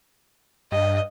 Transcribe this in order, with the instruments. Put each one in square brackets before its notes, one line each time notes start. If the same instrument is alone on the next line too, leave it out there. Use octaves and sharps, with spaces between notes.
[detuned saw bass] G2 [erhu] D#5